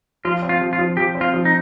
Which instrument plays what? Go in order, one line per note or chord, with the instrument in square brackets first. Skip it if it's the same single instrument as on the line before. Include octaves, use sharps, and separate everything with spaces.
[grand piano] F3 [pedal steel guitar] F4
[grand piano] C4
[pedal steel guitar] F4
[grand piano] F3
[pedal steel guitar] F4
[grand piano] F3
[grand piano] F3 [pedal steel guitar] G4
[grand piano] C4
[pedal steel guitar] F4
[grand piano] F3
[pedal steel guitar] D#4